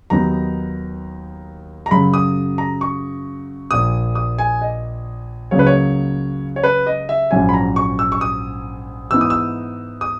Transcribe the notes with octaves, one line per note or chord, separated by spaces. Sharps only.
D#2 D#3 F#3 B3 D#4 A#5
A#5
F#2 C#3 F#3 B5
D#6
A#5
C#6
A#1 A#2 A#3 D#6
D#6
G#5
D#5
C#2 C#3 F#3 A#3 C#5
B4
C#5
C#5
B4
D#5
E5
A#1 G#2 F#3 C#4 G#5
B5
A#5
C#6
E6
C#6
D#6
G#2 E3 B3 D#4 E6
D#6
E6
D#6